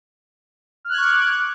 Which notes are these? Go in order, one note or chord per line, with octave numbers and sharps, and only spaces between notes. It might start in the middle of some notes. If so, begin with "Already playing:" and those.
C#6 D6 F6 F#6 G#6